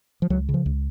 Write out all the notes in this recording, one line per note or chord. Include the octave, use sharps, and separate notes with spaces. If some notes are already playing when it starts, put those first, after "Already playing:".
F3
C#2 F#3
C#3
F3
C#2